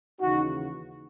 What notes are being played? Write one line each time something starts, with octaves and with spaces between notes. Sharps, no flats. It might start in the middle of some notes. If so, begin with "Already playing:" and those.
D#2 C#3 E3 D#4 F#4